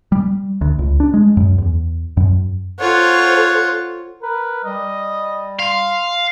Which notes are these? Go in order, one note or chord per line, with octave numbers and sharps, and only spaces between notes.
G3
D2
C#2
D4
G#3
F#2
E2
F#2
F4 A4 C5 C#5 F#5
A#4 B4
G3 D#5
F5 C6